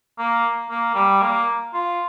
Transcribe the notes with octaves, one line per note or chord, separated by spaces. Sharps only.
A#3
A#3
G3
A#3
F4